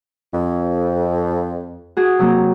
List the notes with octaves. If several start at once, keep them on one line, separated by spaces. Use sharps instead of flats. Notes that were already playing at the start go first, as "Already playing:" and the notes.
F2
F#4 G#4
C3 F#3 A#3